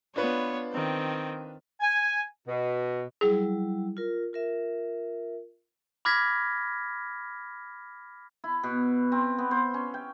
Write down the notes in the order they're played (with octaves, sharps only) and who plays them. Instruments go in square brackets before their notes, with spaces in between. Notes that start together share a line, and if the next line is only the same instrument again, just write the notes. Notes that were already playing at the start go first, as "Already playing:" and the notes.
[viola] B3 C#5 [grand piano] D4 F4 B4
[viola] D#3 C4
[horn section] G#5
B2
[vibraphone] F#3 G3 E4 [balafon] G#4
[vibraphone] F4 A#4
F4 A#4 E5
[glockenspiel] B5 D6 F6 G#6 A#6 B6
[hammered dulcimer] E4
B2
C4
B3
C5
C#4
G5